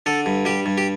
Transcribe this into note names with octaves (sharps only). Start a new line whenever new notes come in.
D3 A4
G2
G3 G4
G2
G4